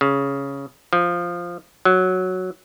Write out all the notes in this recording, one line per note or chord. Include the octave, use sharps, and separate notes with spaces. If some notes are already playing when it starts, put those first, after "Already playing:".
C#3
F3
F#3